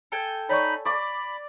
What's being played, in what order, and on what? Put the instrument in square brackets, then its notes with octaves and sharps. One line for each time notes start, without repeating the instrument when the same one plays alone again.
[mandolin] A4 G5 G#5
[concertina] D#4 B5 [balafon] C#5 D5 C#6
[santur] D5 D6 [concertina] B5 [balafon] C#6